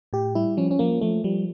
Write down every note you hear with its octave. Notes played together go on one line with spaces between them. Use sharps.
A2 G4
G3 E4
F3 C#4
C#4
F3 A#3
F3 A3
F3 G3